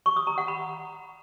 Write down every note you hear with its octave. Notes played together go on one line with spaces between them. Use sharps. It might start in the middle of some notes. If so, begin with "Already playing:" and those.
C#6
D#6
A#5
F#5
B5